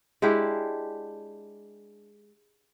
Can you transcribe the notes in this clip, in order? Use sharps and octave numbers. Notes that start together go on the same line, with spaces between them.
G#3 D4 E4 G4